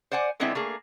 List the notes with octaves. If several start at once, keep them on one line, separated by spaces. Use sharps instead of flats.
C5 D5 F#5 G#5
D3 G#3 B3 C4 D4 E4
A3 A#3 G#4